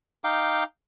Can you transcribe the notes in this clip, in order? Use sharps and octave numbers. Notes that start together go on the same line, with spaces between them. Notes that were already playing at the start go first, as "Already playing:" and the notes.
D#4 F5 G5 D6